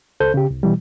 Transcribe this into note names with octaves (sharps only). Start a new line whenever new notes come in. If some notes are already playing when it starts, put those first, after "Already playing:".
C#2 A4 C5 G6
C#3 G4
C2
B2 E3 G3